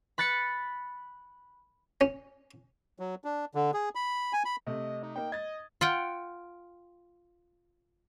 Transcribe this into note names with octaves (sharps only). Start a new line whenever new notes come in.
B5 F#6 A6 B6 C#7
C#4
F#3
D4
D3
G#4
B5
G#5
B5
C3 A3 D#5
D#4
A#3 D#4 G5
D#5 G#6 A6
F4 F#5 G5